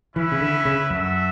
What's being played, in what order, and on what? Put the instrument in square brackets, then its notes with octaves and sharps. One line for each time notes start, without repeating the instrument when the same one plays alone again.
[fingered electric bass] E3 [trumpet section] C#4 E4 B4 E5
[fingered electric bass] C#3
D3
C#3
[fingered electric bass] F#2 [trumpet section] F#4 A4 E5